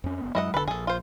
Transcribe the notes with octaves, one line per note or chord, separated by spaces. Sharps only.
F2 C#4
F#1 B3
F#2 F#3 G#3 E4 D#5 F#5
F1 D3 A4 B4
A#1 G#4 A4
F4 C5